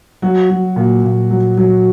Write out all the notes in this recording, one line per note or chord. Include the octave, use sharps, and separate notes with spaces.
F#3 F#4
F#3
A#2
A#2
F#3
F#3